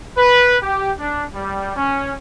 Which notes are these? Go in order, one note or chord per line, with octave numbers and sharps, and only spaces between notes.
B4
G4
D4
G3
C#4